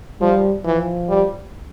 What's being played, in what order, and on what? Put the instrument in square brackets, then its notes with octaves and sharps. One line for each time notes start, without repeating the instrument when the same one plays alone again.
[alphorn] F3 [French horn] G3
[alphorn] E3 [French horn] F3
[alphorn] G3